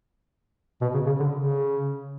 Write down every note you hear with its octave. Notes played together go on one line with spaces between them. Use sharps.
B2
C#3
C#3
D3
C#3